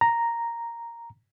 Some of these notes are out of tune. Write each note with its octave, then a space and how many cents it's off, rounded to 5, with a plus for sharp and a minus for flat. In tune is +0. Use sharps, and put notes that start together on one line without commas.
A#5 +0